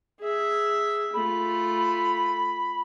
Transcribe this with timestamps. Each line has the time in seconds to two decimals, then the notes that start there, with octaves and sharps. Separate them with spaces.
0.20 G#4 E5
1.13 A3 F4 B5